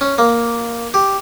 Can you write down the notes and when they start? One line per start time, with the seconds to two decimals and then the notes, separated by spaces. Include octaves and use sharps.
0.01 C#4
0.18 A#3
0.94 G4